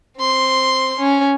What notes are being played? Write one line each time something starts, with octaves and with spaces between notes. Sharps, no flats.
C4 C6
C#4